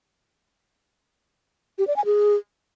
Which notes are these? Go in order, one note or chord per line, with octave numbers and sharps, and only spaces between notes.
G4
D5
G#5
G#4